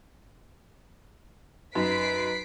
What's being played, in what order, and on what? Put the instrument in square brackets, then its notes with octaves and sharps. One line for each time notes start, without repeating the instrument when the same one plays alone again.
[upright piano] F#2 [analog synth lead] D#4 [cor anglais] B4 [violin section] B6 C7 D7